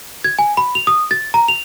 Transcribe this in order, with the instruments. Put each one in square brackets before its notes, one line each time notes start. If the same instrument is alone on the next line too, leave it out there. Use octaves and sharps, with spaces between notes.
[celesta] G#6
G#5
B5
F7
D#6
A6
A#5
F7